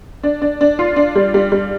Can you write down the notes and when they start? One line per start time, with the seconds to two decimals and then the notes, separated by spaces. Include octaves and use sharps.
0.23 D4
0.42 D4
0.61 D4
0.79 F4
0.96 D4
1.15 G3
1.34 G3
1.52 G3